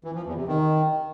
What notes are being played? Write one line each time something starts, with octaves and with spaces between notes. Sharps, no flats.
E3
F3
E2
C3
D#3